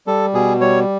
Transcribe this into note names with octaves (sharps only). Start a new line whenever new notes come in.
G3 A4
B2 G#4
G3 C#5